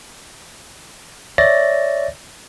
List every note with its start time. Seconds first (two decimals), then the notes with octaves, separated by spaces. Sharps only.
1.38 C#5 D5 E5 A6 A#6